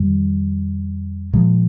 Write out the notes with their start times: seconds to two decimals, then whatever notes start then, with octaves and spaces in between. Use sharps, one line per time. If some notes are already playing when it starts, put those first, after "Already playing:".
Already playing: F2 D#3 G3
1.33 A#2 F3 G#3